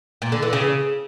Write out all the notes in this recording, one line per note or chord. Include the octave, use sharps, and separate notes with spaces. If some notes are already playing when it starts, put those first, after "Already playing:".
A#2
D3
E3
C#3